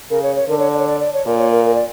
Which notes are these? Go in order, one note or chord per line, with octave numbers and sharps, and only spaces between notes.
C#3 A#4
C#5
C#5
D3 A#4
C#5
D5
C#5
D5
D5
C#5
A#2 A#4
C#5
A#4
A#4
D5